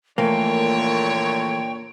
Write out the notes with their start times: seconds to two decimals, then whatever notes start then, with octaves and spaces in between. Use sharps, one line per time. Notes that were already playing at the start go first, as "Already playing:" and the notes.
0.18 A#2 D3 E3 F3 A3 A#3 C#5 G5